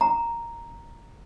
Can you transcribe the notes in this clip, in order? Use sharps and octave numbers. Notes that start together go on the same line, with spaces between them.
A#5